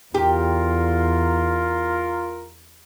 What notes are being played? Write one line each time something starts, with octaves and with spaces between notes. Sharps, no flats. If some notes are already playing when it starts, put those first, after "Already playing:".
E2 F4 G4 A#4